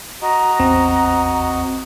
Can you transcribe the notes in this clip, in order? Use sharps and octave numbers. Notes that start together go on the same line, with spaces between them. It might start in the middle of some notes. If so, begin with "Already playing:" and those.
F#4 D#5 A#5
A1 E2 C4